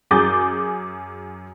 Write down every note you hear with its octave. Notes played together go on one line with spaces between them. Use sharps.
F#2 G#4 D6 D#6 G6 A6